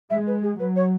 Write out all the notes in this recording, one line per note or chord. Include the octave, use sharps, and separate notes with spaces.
G#3 E5
B4
G#4
F#3 B4
C#5